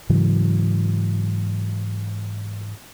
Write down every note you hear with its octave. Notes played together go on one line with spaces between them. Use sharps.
G#2 C#3 E3 F#3